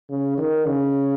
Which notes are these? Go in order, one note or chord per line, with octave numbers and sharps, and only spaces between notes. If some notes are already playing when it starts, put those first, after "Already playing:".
C#3
D#3
C#3